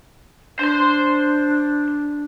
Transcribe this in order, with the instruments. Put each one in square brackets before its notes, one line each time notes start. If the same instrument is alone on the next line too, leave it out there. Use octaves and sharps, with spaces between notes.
[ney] D4 [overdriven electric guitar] C5 C6